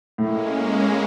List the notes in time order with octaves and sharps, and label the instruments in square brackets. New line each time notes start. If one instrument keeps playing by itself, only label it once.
[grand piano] A2 [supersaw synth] G#3 A#3 C#4